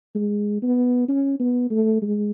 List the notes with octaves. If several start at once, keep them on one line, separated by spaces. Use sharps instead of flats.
G#3
B3
C#4
B3
A3
G#3